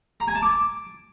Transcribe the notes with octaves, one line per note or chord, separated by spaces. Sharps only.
A#5
G#5
A5
D6